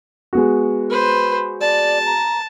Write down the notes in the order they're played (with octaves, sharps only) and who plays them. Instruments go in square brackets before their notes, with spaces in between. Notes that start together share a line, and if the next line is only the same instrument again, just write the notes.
[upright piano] G#3 B3 F#4
[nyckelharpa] B4 C5
[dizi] D5 [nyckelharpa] A5
[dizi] A#5